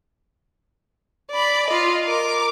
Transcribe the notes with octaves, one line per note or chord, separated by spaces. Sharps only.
D5 B5
F4 D#5
A#4 D6